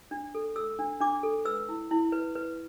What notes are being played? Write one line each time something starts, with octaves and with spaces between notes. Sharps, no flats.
D4
A4
A4 E6
D4
D4 D6
A4
B4 E6
E4
E4
B4
B4